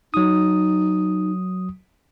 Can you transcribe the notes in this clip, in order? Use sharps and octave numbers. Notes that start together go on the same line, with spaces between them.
F#3 D#4 D#6